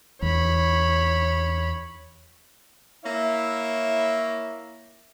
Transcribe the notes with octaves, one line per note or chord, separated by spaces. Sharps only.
E2 C#5 B5
A#3 E4 C#5 E5